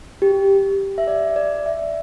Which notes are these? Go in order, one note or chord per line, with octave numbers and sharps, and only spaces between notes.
G4
E5
D5
D5
E5